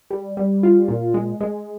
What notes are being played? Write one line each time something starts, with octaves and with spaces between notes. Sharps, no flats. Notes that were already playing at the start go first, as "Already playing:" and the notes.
G3
G3
F4
A#2
G#3
G#3